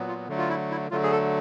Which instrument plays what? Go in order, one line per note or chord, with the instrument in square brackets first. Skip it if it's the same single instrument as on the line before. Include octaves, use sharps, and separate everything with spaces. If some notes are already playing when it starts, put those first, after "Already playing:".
Already playing: [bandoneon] A#2 F#3 B3
F4
D3 F#3 A3
F4
E4
E4
D3 F#3 A3 F4
G#4
A4